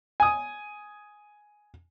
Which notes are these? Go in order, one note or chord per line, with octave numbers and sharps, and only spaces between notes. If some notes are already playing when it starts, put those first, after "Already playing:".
G#5 D#6